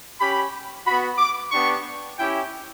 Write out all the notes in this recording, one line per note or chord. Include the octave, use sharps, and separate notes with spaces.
C#4 G4 B5
B3 F#4 B5
D6
B3 D4 G4 C#6
C#4 E4 G4 G5